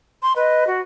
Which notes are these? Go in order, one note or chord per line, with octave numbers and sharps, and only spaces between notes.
C6
B4 D#5
F#4